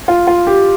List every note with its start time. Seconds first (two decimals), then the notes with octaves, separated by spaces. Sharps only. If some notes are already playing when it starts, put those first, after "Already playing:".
0.08 F4
0.27 F4
0.47 G4